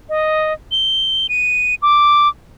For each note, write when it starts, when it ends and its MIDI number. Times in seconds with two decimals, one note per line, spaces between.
0.09 0.53 75
0.72 1.27 103
1.29 1.75 99
1.82 2.29 86